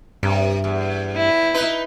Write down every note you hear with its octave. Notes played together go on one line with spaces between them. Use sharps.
G2 C3
E2
E4
D#4 B4